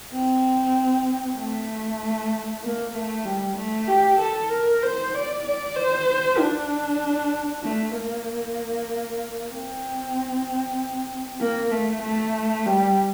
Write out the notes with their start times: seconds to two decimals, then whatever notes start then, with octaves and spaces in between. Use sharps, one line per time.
0.12 C4
1.37 A3
2.63 A#3
2.94 A3
3.25 G3
3.56 A3
3.88 G4
4.19 A4
4.51 A#4
4.83 C5
5.14 D5
5.44 D5
5.76 C5
6.39 D4
7.63 A3
7.95 A#3
9.52 C4
11.40 A#3
11.71 A3
12.02 A3
12.66 G3